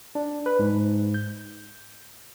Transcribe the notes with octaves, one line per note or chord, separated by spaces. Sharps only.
D4
B4
G#2
G6